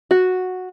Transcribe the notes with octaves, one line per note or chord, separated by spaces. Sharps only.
F#4